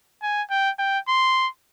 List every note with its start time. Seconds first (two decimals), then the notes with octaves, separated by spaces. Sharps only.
0.22 G#5
0.50 G5
0.79 G5
1.08 C6